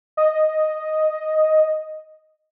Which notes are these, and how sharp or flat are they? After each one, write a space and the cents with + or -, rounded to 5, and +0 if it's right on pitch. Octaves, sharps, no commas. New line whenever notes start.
D#5 +0